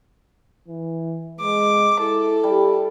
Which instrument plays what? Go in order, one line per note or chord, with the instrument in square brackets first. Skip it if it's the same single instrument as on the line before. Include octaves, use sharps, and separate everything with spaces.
[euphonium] E3
[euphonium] G#3 [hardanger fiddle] D6
[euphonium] E4 [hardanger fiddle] A4
[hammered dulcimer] G3